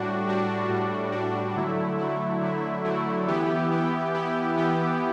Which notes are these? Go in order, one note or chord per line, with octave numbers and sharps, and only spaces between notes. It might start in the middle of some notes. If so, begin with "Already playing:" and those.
Already playing: A2 G3 D4 F#4
A2 G3 D4 F#4
A2 G3 D4 F#4
A2 G3 D4 F#4
D3 F#3 A3 E4
D3 F#3 A3 E4
D3 F#3 A3 E4
D3 F#3 A3 E4
E3 B3 E4 G4
E3 B3 E4 G4
E3 B3 E4 G4
E3 B3 E4 G4